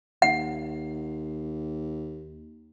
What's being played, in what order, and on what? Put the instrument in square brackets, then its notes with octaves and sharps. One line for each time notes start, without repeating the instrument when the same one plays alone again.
[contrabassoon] D#2 [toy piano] F#5